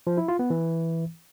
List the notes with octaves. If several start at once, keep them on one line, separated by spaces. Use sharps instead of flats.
F3
E4
F4
B3
E3